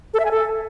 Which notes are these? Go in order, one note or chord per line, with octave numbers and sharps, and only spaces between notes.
A4
E5
G#5
A4